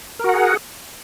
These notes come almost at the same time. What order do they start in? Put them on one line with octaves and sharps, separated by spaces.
A#4 F#4 F#5 G#4